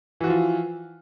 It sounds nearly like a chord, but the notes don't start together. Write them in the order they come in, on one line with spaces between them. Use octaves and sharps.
E3 F#4 F3 F4